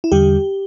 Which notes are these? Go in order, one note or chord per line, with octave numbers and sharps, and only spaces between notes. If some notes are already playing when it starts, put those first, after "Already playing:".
E4
E2 D3 G3 G4